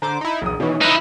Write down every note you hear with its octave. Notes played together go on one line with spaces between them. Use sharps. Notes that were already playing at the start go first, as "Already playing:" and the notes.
D3 C5 A#5 D6
D#4 E4
E1 B1 D#6
B2 D#3 E3 C#4
D#4 E4 B4 F#6 E7